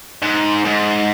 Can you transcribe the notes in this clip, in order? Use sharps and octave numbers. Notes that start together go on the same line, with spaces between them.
G#2
G#2